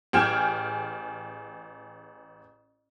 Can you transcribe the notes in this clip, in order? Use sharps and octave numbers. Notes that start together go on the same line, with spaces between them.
A1 G#4 G5 F6 G#6 E7